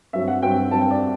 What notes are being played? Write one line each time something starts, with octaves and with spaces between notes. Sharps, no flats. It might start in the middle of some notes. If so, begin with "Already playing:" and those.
G2 F#3 C4 E5
F#5
G2 F#3 C4 G5
G2 F#3 C4 A5
G5
D5